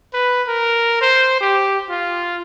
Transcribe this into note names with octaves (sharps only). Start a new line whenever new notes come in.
B4
A#4
C5
G4
F4